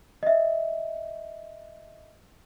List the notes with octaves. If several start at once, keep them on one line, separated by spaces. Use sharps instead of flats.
D#5 E5